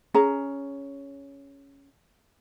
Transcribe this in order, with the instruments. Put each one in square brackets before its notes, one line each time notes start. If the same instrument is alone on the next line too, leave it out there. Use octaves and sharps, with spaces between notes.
[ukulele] C#4 G#4 A#5